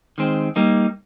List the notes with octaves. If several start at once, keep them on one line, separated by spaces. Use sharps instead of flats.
D#3 G#3 C4
G3 A#3 D#4